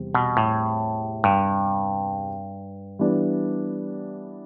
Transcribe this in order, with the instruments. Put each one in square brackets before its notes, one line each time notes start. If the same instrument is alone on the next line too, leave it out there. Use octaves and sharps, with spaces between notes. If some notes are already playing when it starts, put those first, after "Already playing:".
Already playing: [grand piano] E2 C3 G3 C4
[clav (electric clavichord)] B2
A2
G2
[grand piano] E3 G3 B3 D4